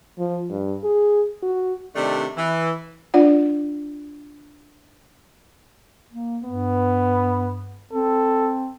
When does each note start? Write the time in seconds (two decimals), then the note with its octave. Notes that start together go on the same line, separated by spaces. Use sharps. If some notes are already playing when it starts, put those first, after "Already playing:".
0.19 F3
0.50 G2
0.84 G#4
1.43 F#4
1.96 C3 D#3 A3 D4
2.37 E3
3.14 D4 F4 D5 F#5
6.12 A#3
6.44 G2 B3
7.93 C4 A4